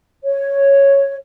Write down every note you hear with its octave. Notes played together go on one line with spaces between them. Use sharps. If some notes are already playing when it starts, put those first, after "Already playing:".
C#5